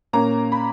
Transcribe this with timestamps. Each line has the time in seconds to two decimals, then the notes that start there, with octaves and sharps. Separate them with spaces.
0.13 A#2 A#3 C#4 A#5
0.52 B5